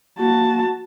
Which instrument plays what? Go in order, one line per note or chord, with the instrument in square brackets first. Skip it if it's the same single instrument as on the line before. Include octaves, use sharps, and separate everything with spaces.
[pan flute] A#3 [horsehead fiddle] F#4 A5